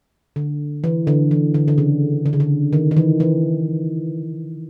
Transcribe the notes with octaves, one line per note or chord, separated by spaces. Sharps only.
D3
E3
D3
E3
D3
D3
C#3
D3
C#3
D3
D#3
D#3
E3
E3